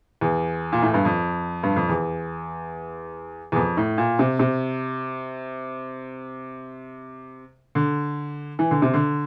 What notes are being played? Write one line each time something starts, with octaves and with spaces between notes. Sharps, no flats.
E2
A#2
A2
G2
F2
G2
F2
E2
E2
F2
A2
A#2
C3
C3
D3
E3
D3
C3
D3